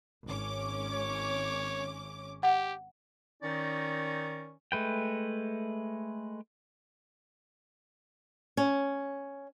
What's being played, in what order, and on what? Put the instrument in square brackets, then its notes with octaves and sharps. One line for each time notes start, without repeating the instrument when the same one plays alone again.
[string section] G#1 C#4 D6
[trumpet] C#5
[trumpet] G4 [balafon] F#5
[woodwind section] D#3 C#4 D#4 A#4 D5
[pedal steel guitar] G#3 A3 B4 G5
[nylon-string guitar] C#4